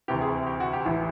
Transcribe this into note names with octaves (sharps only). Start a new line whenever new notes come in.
D2 C3 E3 G4
G#4
G4
F#4
G4
A1 A2 E3